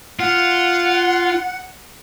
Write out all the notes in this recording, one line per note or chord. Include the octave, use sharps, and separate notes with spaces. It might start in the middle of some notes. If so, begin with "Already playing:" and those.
F4 F#5